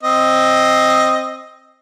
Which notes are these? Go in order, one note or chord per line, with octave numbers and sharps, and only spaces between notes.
C4 D#5